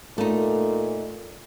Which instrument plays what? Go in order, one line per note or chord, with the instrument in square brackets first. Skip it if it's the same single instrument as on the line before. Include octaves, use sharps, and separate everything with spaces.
[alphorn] A#2 [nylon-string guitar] A3 D#4